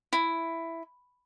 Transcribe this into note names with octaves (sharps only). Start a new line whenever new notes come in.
E4